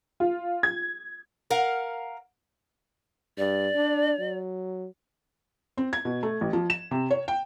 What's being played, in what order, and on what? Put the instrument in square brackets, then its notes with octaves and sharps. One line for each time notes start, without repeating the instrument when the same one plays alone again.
[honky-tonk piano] F4
G#6
[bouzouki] A#4 F5 F#5
[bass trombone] G2 [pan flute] D5
[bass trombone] D4
F#3
[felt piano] C4
G#6
B2
A3
A1
F3
E7
C3
C#5
G5